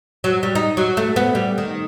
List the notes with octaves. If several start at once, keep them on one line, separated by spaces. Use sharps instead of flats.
F#3
G3
D#4
F#3
A3
B3
G3
D#3